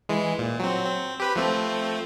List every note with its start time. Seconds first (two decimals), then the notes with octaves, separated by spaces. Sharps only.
0.09 E3 G#3
0.39 A#2
0.59 F#3 C4
0.86 C4
1.20 G4 B4 B5
1.36 F3 A3 C4